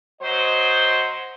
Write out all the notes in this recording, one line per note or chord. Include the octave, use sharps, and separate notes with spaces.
F#3 C5 D#5